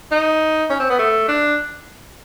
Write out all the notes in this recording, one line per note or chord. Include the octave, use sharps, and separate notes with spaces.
D#4
C#4
C4
B3
A3
D4